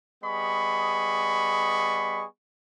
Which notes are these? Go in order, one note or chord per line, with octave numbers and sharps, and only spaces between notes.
G3 B3 G#4 D#5 B5 C#6